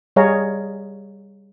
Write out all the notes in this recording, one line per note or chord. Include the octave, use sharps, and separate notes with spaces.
G3 G#4 C#5 D#5 F5 A#5